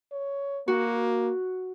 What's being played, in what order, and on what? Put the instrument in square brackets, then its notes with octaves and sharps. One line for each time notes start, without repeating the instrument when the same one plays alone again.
[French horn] C#5
[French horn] A#3 [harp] F#4